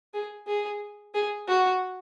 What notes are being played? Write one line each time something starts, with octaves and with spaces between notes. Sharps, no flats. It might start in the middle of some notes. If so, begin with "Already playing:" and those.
G#4
G#4
G#4
F#4